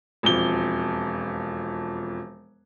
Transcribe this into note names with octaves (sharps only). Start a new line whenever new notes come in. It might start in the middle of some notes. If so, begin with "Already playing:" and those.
E1 F2 G7